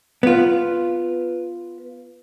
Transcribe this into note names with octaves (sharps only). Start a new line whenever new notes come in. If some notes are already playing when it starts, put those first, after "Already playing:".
B3 F4